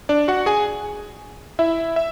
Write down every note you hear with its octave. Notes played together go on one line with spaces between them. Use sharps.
D4 D5
F#4 F#5
G#4 G#5
E4 E5
E5